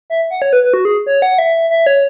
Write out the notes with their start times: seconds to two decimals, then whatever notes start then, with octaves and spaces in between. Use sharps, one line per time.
0.10 E5
0.31 F#5
0.42 C#5
0.53 B4
0.63 B4
0.74 F#4
0.85 G#4
1.06 C#5
1.22 F#5
1.38 E5
1.70 E5
1.86 C#5